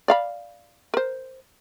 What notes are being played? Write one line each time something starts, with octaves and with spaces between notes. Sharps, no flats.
D5 F5 B5
A#4 C5